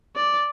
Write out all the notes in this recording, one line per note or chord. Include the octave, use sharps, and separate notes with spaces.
D5